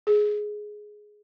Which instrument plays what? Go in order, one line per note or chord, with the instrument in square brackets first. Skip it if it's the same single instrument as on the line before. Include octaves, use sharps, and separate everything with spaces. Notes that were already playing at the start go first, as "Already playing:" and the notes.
[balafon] G#4